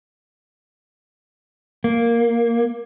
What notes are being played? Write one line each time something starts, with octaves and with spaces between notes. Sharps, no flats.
A#3